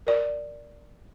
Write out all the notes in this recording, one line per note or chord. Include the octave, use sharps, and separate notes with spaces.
A#4 D5